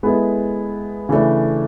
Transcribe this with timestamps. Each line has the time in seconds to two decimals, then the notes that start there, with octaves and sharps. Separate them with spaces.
0.03 G#3 B3 E4 A4
1.09 C#3 E3 A3 D4